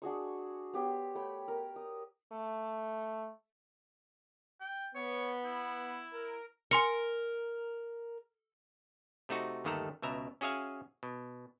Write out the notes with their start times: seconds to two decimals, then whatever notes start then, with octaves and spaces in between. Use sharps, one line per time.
0.02 D4 F#4 G#4 C#6
0.74 B3 G4 C#5 C6
1.15 A3 C#5 G5 B5
1.48 A#4
1.76 D#6
2.33 A3
4.61 G5
4.95 B3 C#5
5.44 E4
6.14 A#4
6.71 A#4 G#5 C6 C#7
9.29 C3 A3 D#4 F#4
9.64 G1 D#2 D#3 A3 A4 A#5
10.02 C#2 B2 E5 A#5
10.41 C#4 F#4 G#4 E5 F5 G#5
11.03 B2